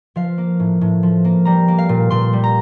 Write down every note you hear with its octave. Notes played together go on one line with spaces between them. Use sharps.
F3 F5
A#3
A2
A2
F3
A#3
G3 A#5
A#3
F5
A#2
A#2 C6
G3
A#5